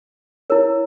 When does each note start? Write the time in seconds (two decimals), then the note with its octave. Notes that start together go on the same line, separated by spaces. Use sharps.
0.50 E4 A#4 C#5